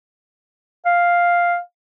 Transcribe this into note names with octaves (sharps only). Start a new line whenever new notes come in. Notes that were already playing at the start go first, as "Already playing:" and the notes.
F5